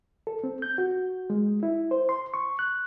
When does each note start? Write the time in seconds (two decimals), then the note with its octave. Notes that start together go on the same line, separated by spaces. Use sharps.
0.27 A4
0.44 C4
0.62 G6
0.78 F#4
1.30 G#3
1.63 E4
1.91 C5
2.09 C6
2.34 C#6
2.59 F#6